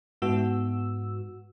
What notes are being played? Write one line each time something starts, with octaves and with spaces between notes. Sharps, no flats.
G#2 B3 F#4 E6